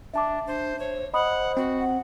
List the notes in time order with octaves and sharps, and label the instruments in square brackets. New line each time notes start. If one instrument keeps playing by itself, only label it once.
[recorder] D4 [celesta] E5 A5 D6
[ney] D4 [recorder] C5
[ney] C5 [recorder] C#5
[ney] C5 [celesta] D#5 B5 D#6 [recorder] F#5
[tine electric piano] C4 [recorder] F#4
[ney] F#5